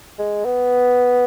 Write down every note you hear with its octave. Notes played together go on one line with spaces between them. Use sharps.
G#3
B3